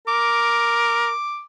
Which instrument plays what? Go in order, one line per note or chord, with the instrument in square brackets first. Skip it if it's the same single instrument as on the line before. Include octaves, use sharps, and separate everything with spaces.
[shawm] A#4 [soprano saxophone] D6